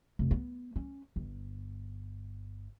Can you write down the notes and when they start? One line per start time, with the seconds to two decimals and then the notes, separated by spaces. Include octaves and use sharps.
0.19 F1
0.31 B3
0.76 C#4
1.16 G1